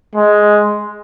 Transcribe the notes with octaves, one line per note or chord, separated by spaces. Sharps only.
G#3